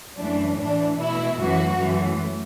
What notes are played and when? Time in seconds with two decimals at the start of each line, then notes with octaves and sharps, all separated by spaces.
0.17 F#2 E3 A3 D4
0.57 A2 E3 A3 D4
0.97 B2 A3 E4
1.37 F#2 E3 A3 F#4
1.77 F#2 E3 A3